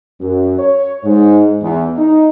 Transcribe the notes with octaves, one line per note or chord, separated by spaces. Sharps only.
F#2
C#5
G#2
E2
D#4